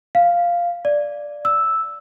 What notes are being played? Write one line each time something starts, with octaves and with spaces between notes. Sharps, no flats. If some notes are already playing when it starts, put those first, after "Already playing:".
F5
D5
E6